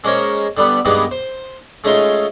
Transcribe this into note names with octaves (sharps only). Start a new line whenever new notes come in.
G#3 A#3 C#4 A#4 C5 C#5
D3 G3 B3
G2 D#3 G#3 A#3 B3
C5
G#3 A3 C#4 D#4 F4 C6